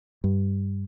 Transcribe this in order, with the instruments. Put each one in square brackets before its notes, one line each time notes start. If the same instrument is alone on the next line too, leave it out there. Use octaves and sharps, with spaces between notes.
[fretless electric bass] G2